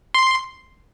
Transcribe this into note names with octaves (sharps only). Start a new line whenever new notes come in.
C6